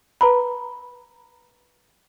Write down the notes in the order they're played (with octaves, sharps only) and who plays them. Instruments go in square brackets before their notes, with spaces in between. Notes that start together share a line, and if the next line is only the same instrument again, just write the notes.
[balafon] B4 A#5 B5